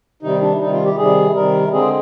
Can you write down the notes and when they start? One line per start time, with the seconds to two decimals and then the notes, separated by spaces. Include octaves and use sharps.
0.23 C3 D#3 G3 D#4
0.41 D4
0.60 C3 D#3 G3 D#4
0.72 F4
0.85 G4
0.98 C3 D#3 G3 G#4
1.35 C3 D#3 G3 A#4
1.73 D3 G#3 C4 G#4